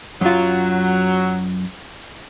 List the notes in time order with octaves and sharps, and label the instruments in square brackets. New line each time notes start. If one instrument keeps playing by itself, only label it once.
[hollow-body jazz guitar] F#2 F4 [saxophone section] F#3